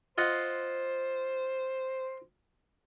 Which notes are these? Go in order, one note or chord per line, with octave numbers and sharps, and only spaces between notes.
F4 C5 D#5 F#5